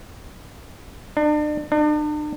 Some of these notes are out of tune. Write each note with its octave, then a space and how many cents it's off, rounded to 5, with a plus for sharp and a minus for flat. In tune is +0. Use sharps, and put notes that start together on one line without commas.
D4 +35
D4 +40